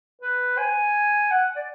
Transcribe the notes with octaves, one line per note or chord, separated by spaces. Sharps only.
B4
G#5
F#5
D5